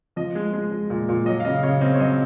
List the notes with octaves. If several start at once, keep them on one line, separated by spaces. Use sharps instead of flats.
F3 D#5
G#3
G#3
G#3
A#2
A#2
F#3 D#5
F5
C#3 D#5
C#3 C#5
C4 D#5
C#5
F#3 D#5